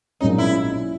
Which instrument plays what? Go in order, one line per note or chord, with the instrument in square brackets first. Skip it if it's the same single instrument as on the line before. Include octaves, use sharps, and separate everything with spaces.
[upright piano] B1 A#2 G#3 C#4 [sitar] D#4
[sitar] E4